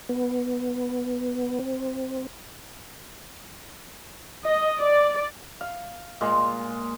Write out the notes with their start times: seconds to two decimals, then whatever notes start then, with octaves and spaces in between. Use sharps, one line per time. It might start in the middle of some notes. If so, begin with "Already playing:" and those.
0.09 B3
1.59 C4
4.45 D#5
4.80 D5
5.61 F5
6.21 A#2 G#3